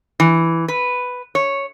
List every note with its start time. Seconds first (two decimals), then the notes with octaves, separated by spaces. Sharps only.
0.20 E3
0.68 B4
1.35 C#5